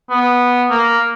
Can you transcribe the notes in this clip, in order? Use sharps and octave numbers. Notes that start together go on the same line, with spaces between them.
B3
A#3